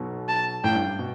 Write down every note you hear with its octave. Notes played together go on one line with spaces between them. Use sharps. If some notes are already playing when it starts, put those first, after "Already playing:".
Already playing: B1 B2
A5
A1 A2 G5
G2
G2
B2